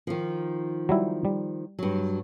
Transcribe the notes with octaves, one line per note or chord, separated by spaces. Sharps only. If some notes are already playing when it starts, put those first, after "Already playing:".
D#3 F3
F#3 G3 E4
G3
G2 F#3